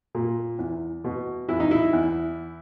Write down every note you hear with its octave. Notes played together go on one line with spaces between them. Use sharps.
A#2
E2
B2
E2 E4
D#4
E4
E2